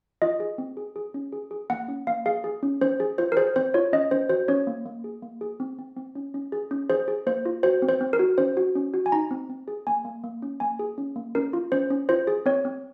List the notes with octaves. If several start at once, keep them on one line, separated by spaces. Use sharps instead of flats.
F4 D#5
G#4
C4
G#4
G#4
C#4
G#4
G#4
A#3 F#5
C#4
A#3 F5
G#4 F5
G#4
C#4
C#4 C5
G#4
F4 C5
A#4
G#4 C5
C4 C5
F4 C#5
C#4 D#5
C#4 C5
F#4 C5
C#4 C#5
A#3
A#3
G#4
A#3
G#4
C4
C4
C4
C#4
C#4
G#4
C#4
G#4 C5
G#4
A#3 C5
F4
F#4 C5
C4
C5
C4
A#4
F#4
C#4 C5
F#4
C#4
F#4
G#5
D#4 A#5
C4
C4
G#4
A#3 G#5
A#3
A#3
C#4
A#3 G#5
G#4
C#4
A#3
C#4 A#4
F4
C#4 C5
C#4
F4 C5
G#4
C4 C#5
C4